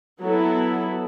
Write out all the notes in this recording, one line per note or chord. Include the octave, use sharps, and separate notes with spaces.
F#3 B3 E4 A4